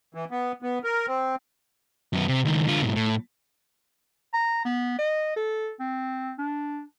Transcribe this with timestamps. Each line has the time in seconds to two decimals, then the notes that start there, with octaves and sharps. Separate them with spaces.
0.14 E3
0.31 B3
0.62 B3
0.84 A#4
1.07 C4
2.13 F#2 B3
2.28 C3
2.45 C#2 D#3
2.68 D3 F4
2.82 G#2 B2
2.96 A2
4.34 A#5
4.65 B3
4.99 D#5
5.36 A4
5.80 C4
6.39 D4